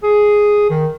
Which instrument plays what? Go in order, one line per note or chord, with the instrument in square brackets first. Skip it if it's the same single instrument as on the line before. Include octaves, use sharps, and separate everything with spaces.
[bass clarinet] G#4
D#3